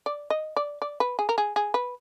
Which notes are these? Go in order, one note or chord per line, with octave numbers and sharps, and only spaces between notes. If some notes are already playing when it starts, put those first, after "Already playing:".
D5
D#5
D5
D5
B4
G#4
A#4
G#4
G#4
B4